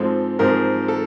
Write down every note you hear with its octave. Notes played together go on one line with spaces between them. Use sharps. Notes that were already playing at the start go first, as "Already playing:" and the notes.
Already playing: G#2 F3 G#3 C4 A4
G#2 F3 G#3 C4 A#4
A4